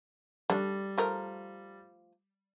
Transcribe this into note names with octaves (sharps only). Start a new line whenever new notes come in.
G3 A3 D4
F3 A3 A#4